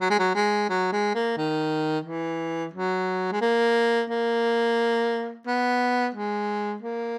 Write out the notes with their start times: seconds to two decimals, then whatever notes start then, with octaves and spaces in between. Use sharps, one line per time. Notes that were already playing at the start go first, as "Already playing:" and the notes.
0.01 F#3
0.10 G#3
0.19 F#3
0.35 G#3
0.70 F#3
0.92 G#3
1.15 A#3
1.37 D#3
2.05 E3
2.74 F#3
3.32 G#3
3.41 A#3
4.10 A#3
5.47 B3
6.15 G#3
6.82 A#3